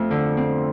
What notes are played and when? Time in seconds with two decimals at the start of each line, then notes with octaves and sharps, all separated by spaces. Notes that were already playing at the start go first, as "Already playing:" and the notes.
Already playing: F2 A3
0.11 D3
0.37 C4